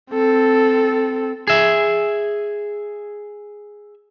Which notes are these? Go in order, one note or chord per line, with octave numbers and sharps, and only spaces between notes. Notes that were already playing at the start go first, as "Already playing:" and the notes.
C4 A4
G#4 E5